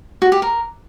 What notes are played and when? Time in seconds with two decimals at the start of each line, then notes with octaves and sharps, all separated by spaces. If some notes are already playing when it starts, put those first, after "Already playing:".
0.22 F#4
0.32 G4
0.42 A#4